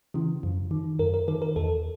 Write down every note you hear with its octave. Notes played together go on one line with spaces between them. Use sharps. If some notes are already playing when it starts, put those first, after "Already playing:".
C#3 E3
F#2
D#3
F#2 A#4
A#4
D#3 A#4
A#4
E2 A4